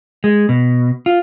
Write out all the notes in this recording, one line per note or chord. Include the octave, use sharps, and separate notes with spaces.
G#3
B2
F4